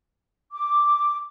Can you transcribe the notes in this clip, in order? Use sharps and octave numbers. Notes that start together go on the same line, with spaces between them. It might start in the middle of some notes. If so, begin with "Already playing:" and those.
D6